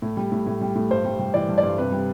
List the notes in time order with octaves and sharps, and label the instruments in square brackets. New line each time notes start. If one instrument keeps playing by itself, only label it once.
[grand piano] A2
G3
A2
A2
G3
A2
G2 C5
G3
G3
E3 D5
G2
D5
G2
C3 B4
G3